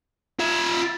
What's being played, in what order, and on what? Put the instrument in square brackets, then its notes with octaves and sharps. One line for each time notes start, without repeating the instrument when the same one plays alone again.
[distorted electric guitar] F4 E5